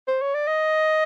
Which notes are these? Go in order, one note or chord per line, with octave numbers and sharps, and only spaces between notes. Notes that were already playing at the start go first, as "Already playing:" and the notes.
C5
C#5
D5
D#5